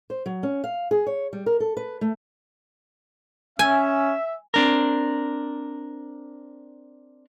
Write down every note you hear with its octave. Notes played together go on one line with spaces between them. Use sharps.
C5
F#3
C#4
F5
G#4
C#5
G3
A#4
A4
B4
A3
C#4 E5 G#5
C4 D4 A#4